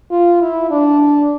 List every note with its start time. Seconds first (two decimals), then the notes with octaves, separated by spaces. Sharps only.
0.11 F4
0.41 E4
0.71 D4